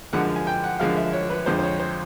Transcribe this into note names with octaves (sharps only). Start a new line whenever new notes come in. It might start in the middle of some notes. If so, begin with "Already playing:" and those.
F#2 D3 F3 G#3 F#5
G#5
G5
F#5
F#2 D3 F3 G#3 F5
E5
C#5
B4
F2 D3 F3 G#3 C5
C5
C#5
C5